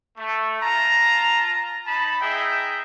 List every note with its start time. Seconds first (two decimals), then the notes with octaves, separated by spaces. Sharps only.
0.18 A3
0.62 F4 A5 A#5
1.87 D#4 A5 B5
2.21 D#4 G#4 D#5 E5 G5